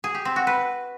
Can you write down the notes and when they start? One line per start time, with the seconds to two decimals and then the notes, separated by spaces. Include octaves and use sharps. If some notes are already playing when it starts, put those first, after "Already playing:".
0.04 G#4
0.15 G4
0.25 C4
0.36 F#4
0.47 B4